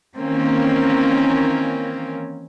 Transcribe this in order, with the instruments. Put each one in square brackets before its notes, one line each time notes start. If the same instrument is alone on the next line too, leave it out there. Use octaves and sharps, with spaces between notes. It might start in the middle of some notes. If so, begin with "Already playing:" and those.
[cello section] D#3 E3 A#3 C4 C#4